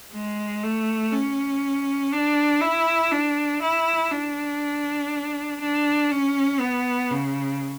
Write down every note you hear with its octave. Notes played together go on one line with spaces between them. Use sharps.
G#3
A3
C#4
D4
E4
D4
E4
D4
D4
C#4
B3
C#3